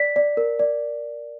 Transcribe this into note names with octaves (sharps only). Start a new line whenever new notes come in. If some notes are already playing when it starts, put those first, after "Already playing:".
Already playing: D5 B6
D5
A#4
D5